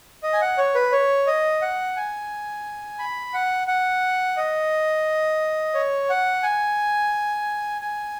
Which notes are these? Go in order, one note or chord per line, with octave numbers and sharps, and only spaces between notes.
D#5
G#5
F#5
C#5
B4
C#5
D#5
F#5
G#5
B5
F#5
F#5
D#5
C#5
F#5
G#5
G#5